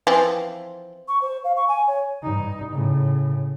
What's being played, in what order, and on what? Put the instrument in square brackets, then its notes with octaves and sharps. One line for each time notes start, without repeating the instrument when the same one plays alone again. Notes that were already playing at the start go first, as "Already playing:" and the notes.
[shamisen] E3 F3 C4
[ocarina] C#6
C5
F5
C#6
G#5
C#5
[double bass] G2 D#4
A2 C#3